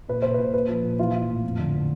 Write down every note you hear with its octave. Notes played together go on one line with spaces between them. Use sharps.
A#2 B4
A#2 C5
A#2 B4
A#2 B4
F3
A#2
E3 F4
E3
A2
F2
D3
F3